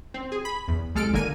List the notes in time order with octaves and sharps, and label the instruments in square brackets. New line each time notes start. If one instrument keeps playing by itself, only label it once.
[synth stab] C4
G#4
B5
E2
C2 G#3 A4 F6 D7
G#1 D3 A#3 G#5 D#7